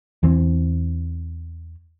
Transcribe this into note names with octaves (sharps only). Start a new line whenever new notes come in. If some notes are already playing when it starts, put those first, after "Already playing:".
E2 E3 C4